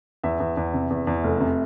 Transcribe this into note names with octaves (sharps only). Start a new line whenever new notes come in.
E2 E5
E2
E2
C3
E2
E2
F1
C3